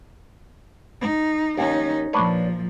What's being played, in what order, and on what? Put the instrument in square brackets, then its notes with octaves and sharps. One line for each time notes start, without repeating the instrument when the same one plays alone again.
[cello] D#4
[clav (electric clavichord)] D#2 [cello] C#4 D#4
[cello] A#2 F3 [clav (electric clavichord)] D4 B4 C#5